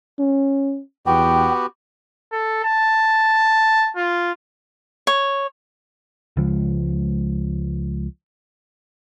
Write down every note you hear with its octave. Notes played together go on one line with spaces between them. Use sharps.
C#4
E2 B3 F#4 G4 G5
A4
A5
F4
C#5
C#2 F3 G#3